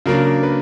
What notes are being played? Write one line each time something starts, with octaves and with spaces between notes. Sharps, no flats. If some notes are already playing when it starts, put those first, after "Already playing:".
C#3 F#3 A#3 D4 A#4
B4